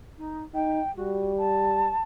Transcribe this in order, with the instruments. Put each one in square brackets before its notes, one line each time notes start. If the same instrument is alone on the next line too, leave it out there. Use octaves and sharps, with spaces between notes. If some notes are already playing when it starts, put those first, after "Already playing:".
[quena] D#4
[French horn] D#4 [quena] G5
[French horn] G3 [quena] F#4
[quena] A5